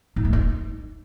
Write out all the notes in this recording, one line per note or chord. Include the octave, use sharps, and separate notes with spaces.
D#4
A3
D#4